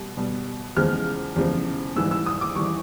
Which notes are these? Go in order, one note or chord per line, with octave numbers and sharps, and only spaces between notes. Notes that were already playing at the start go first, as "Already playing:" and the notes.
Already playing: B2 G3
B2 G3
E2 C#3 F3 G#3 F6
E2 C#3 F3 G#3
G#2 E3 G3 E6
E6
D#6
D6
E3 G3 C#6